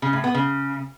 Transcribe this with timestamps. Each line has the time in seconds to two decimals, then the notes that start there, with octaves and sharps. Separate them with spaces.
0.02 C#3
0.13 A2
0.24 B3
0.35 C#3